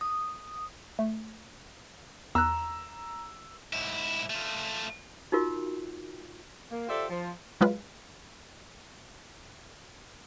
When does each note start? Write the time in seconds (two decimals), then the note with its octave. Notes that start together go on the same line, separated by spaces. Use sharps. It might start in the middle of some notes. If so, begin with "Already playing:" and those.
0.01 D#6
0.99 A3
2.35 E2 A#5 E6 F#6
3.73 G#2 E4
4.30 A3 F4
5.32 D#4 F4 F#4 A#4
6.71 A#3
6.88 F4 G4 A4 C5 D5 E5
7.10 F3 C5
7.61 F#3 G#3 F4 B4